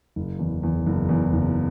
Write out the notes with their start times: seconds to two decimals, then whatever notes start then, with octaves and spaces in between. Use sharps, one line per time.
0.16 F#1
0.39 E2
0.63 E2
0.86 F#1
1.09 E2
1.33 F#1